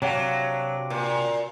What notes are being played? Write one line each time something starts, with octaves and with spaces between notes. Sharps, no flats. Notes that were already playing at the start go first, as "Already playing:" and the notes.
C3 F#3 D4 F5
A#2